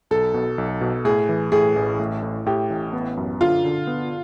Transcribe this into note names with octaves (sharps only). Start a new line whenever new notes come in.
B1 A4
B2
B1
B2
A2 G#4
E3
A2 G#4
A1
A2
A2
A2 G4
A1
B3
F#2
D3 F4
D3
B3